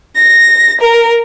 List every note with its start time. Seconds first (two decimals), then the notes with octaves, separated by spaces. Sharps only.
0.14 A#6
0.80 A#4